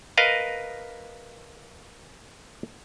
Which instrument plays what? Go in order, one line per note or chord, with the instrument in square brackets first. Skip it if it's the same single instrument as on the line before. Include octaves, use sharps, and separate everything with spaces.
[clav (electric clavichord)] A#4 B4 D#5 F5